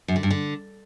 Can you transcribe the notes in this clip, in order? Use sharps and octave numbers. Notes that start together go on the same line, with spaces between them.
F#2
D3
G2
D3